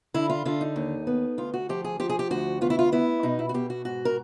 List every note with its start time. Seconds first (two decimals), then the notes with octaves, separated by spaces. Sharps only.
0.14 D3 E4
0.30 F4
0.45 D3 F4
0.61 D#4
0.76 D#2
1.07 B3
1.38 D2 F4
1.54 F#4
1.69 F3 G4
1.84 G#4
2.00 F3 G4
2.10 G#4
2.19 G4
2.30 D2 F#4
2.61 B3 F4
2.70 E4
2.79 F4
2.92 B3 E4
3.23 B2 D#4
3.39 E4
3.49 F#4
3.54 B2 G4
3.70 F#4
3.85 G#2 F#4
4.05 A#4